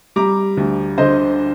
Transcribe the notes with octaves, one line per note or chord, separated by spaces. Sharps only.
G3 A#5 D6
D2
D3 C5 D#5